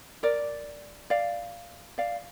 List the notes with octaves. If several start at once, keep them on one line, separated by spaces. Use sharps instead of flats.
A#4 D5
D5 F5
D5 F5